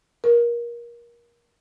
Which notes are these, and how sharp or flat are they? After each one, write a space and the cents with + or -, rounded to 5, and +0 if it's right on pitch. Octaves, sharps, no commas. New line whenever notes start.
A#4 +25